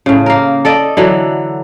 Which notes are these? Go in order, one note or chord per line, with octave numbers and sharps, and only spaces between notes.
A2 C#3
A#3 A#4
A4 D5 D#5
D3 E3 F#3